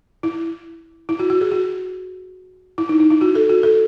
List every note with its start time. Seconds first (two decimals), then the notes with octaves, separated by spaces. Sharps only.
0.23 E4
1.09 E4
1.19 F#4
1.30 F#4
1.41 G#4
1.52 F#4
2.78 E4
2.89 D#4
3.00 D#4
3.11 E4
3.21 F#4
3.35 A4
3.49 F#4
3.63 A4